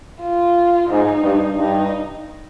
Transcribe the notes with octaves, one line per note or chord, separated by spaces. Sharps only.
F4
G#2 D#4
G2
G2 D#4